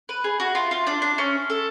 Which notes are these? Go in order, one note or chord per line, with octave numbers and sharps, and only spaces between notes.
B4
G#4
F#4
F4
F4
D4
D4
C#4
A4